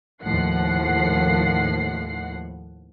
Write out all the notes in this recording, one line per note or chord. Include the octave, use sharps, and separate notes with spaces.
D#2 A2 F3 F#5 C7